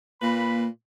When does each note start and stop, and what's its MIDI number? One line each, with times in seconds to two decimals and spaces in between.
0.22 0.65 46
0.22 0.68 58
0.22 0.65 71
0.22 0.65 83